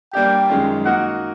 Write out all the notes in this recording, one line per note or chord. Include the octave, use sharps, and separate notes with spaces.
G3 A#3 D4 G4 G5
F#2 D#3 G#3 C#4 F4
A#3 D#4 F#4 A#4 D#5 F#5